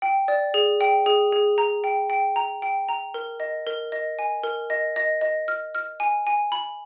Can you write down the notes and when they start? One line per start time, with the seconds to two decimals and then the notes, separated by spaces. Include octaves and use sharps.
0.02 G5
0.28 D5
0.54 G#4
0.81 G5
1.06 G#4
1.32 G#4
1.58 A#5
1.84 G5
2.10 G5
2.36 A#5
2.62 G5
2.89 A#5
3.14 A#4
3.40 D#5
3.67 A#4
3.92 D#5
4.19 G#5
4.44 A#4
4.70 D#5
4.96 D#5
5.21 D#5
5.48 F6
5.75 F6
6.00 G#5
6.27 G#5
6.52 B5